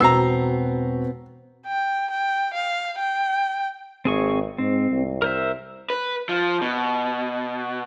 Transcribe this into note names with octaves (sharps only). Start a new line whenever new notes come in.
E1 B3 C4 F#4 A#5 E6 C7
G5
G5
F5
G5
G#1 C4 G#4 C#6
G#2 C4
C2
A#4 C5 E5
B4
F3
B2